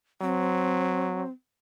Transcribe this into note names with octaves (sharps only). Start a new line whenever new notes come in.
F#3 C4